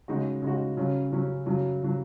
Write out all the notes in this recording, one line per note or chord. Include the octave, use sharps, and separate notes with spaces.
C#3 G#3 D#4 F#4
C#3 G#3 D#4 F#4
C#3 F#3 C#4
C#3 F#3 C#4
F#2 C#3 F#3
C#3 F#3